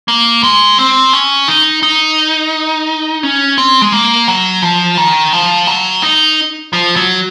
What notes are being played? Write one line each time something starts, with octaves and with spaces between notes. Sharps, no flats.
A#3
G#3
C4
C#4
D#4
D#4
C#4
C4
G#3
A#3
F#3
F3
D#3
F3
F#3
D#4
F3
F#3